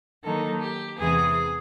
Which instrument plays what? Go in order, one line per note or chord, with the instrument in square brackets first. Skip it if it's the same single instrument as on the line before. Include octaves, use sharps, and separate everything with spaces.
[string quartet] D#3 F#3 A#3 D#4 A4
G4
E2 C3 E3 G#3 B3 G#4